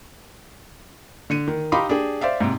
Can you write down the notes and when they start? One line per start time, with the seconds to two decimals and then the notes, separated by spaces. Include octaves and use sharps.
1.30 D3 C#7 D#7
1.48 D#3
1.72 D#4 G4 F5 B5 C6 D6
1.89 D4 G4 G#4
2.21 C5 D5 E5 F5
2.40 G#2 C3